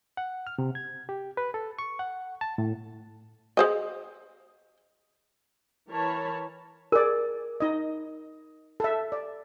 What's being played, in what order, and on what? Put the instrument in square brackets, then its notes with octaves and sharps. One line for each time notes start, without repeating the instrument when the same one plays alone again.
[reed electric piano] F#5
F6
C3
G#6
G4
B4
A4
C#6
F#5
A5
A2
[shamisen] G#4 C5 D#5
[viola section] E3 A#4 C#5 A5 B5
[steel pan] G#4 D5 [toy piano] A#4
[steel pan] D#4 D#5
A4 E5
D5